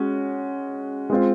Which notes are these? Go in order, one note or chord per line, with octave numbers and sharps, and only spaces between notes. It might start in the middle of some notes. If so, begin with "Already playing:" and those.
Already playing: G#3 C#4 F#4
G#3 C4 F4